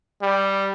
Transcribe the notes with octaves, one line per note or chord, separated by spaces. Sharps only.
G3